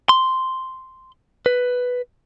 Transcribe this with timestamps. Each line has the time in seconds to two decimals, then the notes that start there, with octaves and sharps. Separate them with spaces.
0.09 C6
1.46 B4